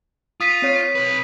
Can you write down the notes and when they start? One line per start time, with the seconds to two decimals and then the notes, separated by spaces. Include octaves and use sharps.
0.41 F4 D#6 B6 D#7
0.62 C4 C#5
0.95 B1 B4